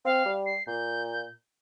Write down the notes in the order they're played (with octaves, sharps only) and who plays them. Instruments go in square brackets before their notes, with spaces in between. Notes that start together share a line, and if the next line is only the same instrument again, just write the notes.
[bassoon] C4 [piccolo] F5
[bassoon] G3
[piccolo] C7
[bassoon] A#2 [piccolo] G6